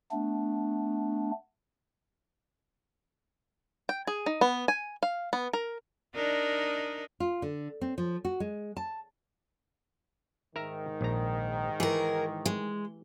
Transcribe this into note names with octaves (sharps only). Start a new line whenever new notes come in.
A3 B3 D4
G5
G#4
D#4
B3
G#5
F5
B3
A#4
D4 D#4 A#4
F4
D3
C4
F3
F#4
G#3
A5
G#2 D#3 A#4 E5 A#5
A#1 A#5
E3 G#4 A#4
G#3